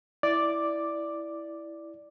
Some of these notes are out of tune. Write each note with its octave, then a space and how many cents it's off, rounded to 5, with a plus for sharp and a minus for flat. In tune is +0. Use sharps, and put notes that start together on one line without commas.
E4 +0 D5 +0 D6 +5